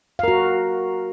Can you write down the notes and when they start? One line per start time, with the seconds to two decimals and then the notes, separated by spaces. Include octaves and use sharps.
0.19 F5
0.23 A#4
0.28 F#4